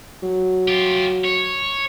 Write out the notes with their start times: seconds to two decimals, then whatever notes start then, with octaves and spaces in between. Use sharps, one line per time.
0.23 F#3
0.68 F4 G4
1.24 C#5